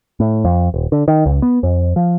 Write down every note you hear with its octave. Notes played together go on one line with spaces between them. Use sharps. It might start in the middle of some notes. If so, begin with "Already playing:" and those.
A2
F2
D#1
D3
D#3
C#2
B3
F2
F3